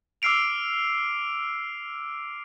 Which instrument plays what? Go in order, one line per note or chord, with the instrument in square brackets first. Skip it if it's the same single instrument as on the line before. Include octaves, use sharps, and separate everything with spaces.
[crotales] D6 E6 F6 C7 D7 F7